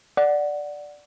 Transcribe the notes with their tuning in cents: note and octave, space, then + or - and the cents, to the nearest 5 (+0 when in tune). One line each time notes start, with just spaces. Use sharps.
D5 +0 F#5 +0